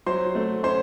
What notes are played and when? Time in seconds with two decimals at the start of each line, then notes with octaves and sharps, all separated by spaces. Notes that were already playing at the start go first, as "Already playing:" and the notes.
0.06 F#3 C5 C6
0.35 A3
0.63 C#4 C5 C6